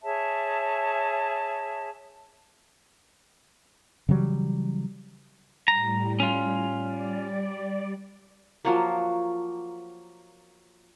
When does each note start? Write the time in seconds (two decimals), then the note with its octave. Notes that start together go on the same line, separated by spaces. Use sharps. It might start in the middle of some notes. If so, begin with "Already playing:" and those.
0.03 G#4 C#5 E5 A5
4.09 C#3 E3 F#3 G3
5.68 A2 G3 A#5
6.20 C#4 F4
6.83 G3 D5
8.65 F3 F#3 A#3